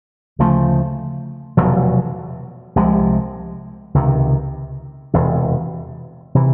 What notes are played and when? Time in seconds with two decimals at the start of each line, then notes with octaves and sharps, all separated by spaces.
0.39 D2 C#3 F3 A3
1.57 F1 E2 B2 F#3
2.76 C2 C3 F3 G#3
3.94 C#2 C3 D#3
5.14 E1 E2 C3
6.35 C3 E3